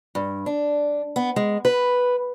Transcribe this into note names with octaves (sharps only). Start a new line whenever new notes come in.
G2
D4
B3
G#3
B4